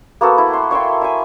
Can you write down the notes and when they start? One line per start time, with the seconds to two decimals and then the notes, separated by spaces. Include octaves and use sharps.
0.21 A#3 B3 F#4 A4
0.38 E4
0.53 C6
0.71 C#5 E5 G5 C6
1.01 E5 G#5